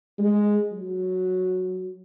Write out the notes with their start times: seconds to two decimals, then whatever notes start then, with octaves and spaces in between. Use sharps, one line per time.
0.18 G#3
0.72 F#3